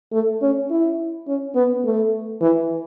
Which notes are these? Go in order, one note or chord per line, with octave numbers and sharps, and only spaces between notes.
A3
C#4
E4
C#4
B3
A3
E3